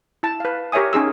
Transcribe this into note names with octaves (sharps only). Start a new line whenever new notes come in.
E4 A5
B4 F5
G4 A#4 C#5 E5 G#5 D#6
C#4 D#4 G#4 E6